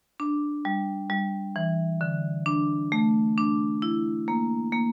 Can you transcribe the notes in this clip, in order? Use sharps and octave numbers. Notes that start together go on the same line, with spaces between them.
D4
G3
G3
E3
D3
D4
A3
D4
E4
A#3
A#3